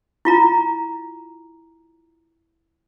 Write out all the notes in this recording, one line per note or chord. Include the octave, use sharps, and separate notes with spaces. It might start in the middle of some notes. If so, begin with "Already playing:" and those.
E4 F4 A#5